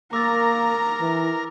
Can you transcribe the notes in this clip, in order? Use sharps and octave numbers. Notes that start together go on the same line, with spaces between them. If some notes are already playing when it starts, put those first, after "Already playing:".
A#3 A#4 A#5 D6 E6 A6
E3